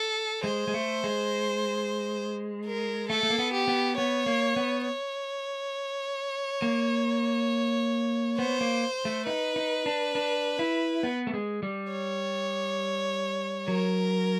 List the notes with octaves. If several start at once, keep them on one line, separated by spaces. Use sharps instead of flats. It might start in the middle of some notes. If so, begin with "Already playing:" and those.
Already playing: A4
G#3 C5
G#3
A3
G#3
A#4
A3 A4
A3
A#3
B3
G4
B3
B3 C#5
A#3
B3
C#5
A#3
B3 C5
A#3
A3
D#4 B4
D#4
D4
D4
E4
B3
A3
G#3
G3
C#5
F#3 A#4